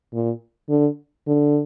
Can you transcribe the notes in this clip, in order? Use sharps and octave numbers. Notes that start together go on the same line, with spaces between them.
A#2
D3
D3